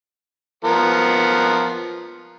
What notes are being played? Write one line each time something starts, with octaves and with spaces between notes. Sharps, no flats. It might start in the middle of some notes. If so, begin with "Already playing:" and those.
F3 B3 A#4